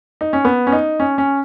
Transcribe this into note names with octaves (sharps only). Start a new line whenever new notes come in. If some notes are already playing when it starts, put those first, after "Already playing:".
D#4
C#4
B3
C#4
D#4
C#4
C#4